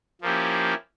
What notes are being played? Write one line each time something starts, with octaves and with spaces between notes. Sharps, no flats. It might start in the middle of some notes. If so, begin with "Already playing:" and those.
F3 A#3 C#4 E4 G4